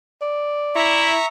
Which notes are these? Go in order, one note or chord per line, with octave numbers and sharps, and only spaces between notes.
D5
E4 E5 A#5 C#6